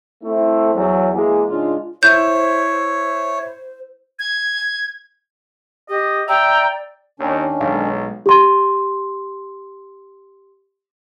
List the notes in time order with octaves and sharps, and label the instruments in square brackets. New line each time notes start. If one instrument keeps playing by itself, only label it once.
[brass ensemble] A3 C4 E4
E2 F#3
E3 G#3 A#3 E4 G#4
G#2 C#3 G#3 D4 F4
[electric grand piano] E4 E7 [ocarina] C5 [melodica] C#5 [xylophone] G6
[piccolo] G#6
[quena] G4 [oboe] D#5
[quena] D5 [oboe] E5 [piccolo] G5 [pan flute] A#5
[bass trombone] D#2 [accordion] D#3 C#4 D4
[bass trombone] B1 [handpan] G#3 F5
[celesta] G4 C6